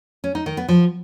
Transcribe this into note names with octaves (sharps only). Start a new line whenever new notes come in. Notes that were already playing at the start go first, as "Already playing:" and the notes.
C#4
D#4
D#3
B3
F3